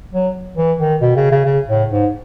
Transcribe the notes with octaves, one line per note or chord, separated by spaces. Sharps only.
F#3
E3
D#3
B2
C#3
C#3
C#3
A2
G#2